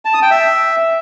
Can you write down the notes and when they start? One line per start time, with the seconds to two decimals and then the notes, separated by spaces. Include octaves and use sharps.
0.05 A5
0.14 D#6
0.22 G5
0.31 E5